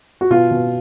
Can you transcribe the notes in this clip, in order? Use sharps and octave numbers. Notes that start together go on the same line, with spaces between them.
F#4
B2 F4
B2